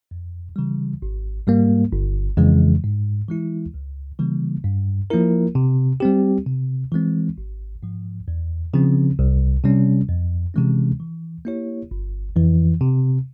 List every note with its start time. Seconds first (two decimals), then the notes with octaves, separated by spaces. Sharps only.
0.11 F2
0.56 C#3 E3 G3
1.02 G#1
1.47 G#2 G3 A#3
1.92 G1
2.37 F2 C#3 E3 G#3
2.84 G#2
3.28 E3 G#3 E4
3.74 C#2
4.19 C#3 E3 G3 A#3
4.64 G2
5.10 F3 A#3 E4 A#4
5.55 C3
6.00 G3 C4 G4
6.47 C3
6.92 E3 G#3 C4
7.38 G#1
7.83 G#2 F3
8.28 E2
8.74 C#3 F3 C4
9.19 C2
9.64 C3 G3 C#4
10.09 F2
10.54 C3 E3 G#3 C#4
11.00 E3
11.45 A#3 E4 G4 C#5
11.91 G1
12.36 F2 E3
12.81 C3